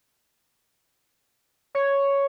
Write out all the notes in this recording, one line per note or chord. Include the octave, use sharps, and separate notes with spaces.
C#5